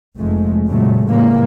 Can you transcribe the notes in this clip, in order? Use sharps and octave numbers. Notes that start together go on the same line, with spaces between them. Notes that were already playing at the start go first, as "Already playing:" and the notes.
F1 F2 G#3 A3
A#2 C#3 F#3 G#3 A3
A2 C#3 E3 G3 G#3 A#3